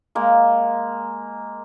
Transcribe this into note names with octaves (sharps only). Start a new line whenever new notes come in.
G#3 A#3